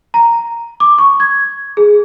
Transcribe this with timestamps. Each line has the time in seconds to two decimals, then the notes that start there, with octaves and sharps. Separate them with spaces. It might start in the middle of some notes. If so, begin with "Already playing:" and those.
0.14 A#5
0.80 D6
0.98 C#6
1.20 G#6
1.77 G#4